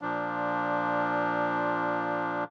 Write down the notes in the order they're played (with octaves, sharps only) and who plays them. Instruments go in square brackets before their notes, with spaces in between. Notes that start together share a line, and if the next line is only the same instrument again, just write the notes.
[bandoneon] A#2 F3 D4